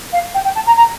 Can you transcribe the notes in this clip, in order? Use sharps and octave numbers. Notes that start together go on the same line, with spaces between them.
F5
G5
G5
A5
A#5
A#5